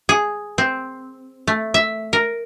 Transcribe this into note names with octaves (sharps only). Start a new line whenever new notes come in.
G#4
C4
A3
E5
A#4